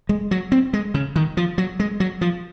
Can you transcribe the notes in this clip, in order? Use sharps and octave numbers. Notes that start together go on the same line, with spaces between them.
G#3
F#3
C4
G#3
C#3
D#3
F3
F#3
G#3
F#3
F3